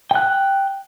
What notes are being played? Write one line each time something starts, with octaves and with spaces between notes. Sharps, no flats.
G5 F#6